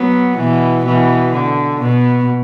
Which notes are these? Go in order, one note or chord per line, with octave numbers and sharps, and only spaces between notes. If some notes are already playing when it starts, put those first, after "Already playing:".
Already playing: F#3 B3
B2 E3
B2 E3
D3
B2